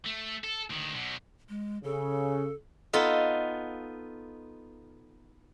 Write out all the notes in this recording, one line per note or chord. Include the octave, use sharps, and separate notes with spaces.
A3
A4
D2 D#3
B2 F#3
G#3
C#3 A4
B3 D#4 F4 A4